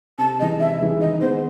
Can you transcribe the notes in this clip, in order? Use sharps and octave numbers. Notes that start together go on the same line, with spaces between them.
C3 A5
E3 G#3 D#5
C3 E5
E3 G#3
D#3 D#5
G#3 B3 C5